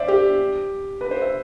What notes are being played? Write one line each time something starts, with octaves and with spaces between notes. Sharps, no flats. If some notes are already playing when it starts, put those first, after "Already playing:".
Already playing: C5 D5 E5
G4
B4
C5
E5